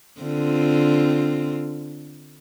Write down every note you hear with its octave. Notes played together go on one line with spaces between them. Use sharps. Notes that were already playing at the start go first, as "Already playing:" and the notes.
D3 C4 F4